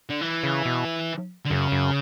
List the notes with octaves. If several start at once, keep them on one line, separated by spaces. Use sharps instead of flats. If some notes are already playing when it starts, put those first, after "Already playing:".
D3
E3
C#3
B2
D3
F#2 C#3
F#2